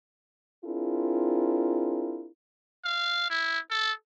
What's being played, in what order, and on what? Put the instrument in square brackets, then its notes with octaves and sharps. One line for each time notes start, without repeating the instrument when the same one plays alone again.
[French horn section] C4 D4 E4 F4 G#4 A#4
[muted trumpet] F5
E4
A4